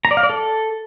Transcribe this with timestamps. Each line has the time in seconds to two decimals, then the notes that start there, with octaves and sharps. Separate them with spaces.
0.05 A#5
0.11 D5
0.17 F5
0.23 D5
0.30 A4